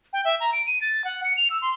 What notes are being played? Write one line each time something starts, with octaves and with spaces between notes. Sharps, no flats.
G5
E5
A#5
D7
D#7
A6
F#5
C#7
F7
E6
C6